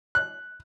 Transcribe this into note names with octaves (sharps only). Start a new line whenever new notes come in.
F#6